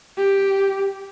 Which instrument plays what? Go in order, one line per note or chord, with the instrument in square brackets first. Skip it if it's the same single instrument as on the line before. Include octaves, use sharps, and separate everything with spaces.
[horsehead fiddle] G4